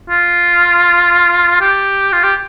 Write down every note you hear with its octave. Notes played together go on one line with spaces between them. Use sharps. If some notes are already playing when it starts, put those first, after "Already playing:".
F4
G4
F4
G4